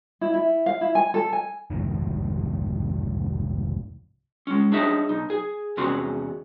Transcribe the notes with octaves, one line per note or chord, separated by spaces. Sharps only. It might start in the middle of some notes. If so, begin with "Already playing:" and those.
E4
E4
F5
E4
G#5
A4
G#5
C2 F2 G#2 D#3
G#3 C#4
D4 D#4 G#4 C#5 D#5 E5
B1 D#4
G#4
E2 C3 C#4 F#4 G#4 C6